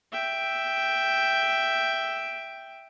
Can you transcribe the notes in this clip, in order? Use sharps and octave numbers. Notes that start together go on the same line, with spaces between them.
E5 G5